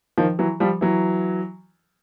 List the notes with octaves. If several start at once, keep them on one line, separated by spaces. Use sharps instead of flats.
D#3 F3
E3 F#3
F3 G3
E3 F#3